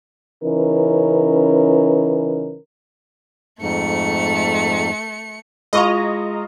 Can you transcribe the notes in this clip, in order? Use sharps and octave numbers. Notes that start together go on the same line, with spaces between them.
C#3 E3 C#4 D#4 A#4 B4
F2 G#2 A3 C#7
G#3 E4 F4 D#5 A#5 C#6